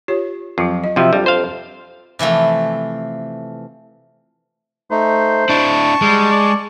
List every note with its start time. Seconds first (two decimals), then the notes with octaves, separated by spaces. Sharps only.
0.08 F4 G4 C#5
0.58 F2 F#3 F4
0.84 D#5
0.96 C3 F3 F#4 E5 G5
1.13 F2 G3 D4
1.26 C5 F5
2.19 C3 E3 F3 A3
4.91 A3 D#4 C5
5.49 D4 E4 A5 C#6
6.02 G3 G#3
6.31 D5